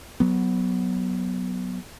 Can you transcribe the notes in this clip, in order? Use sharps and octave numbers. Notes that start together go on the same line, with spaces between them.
F#3 B3